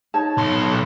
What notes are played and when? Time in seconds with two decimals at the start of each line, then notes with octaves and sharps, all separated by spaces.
0.14 D#4 C#5 A5
0.37 B1 C6